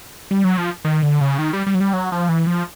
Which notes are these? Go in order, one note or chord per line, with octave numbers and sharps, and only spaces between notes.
G3
F#3
F3
D#3
D3
C#3
D#3
G3
G3
F#3
G3
F#3
F3
E3
F3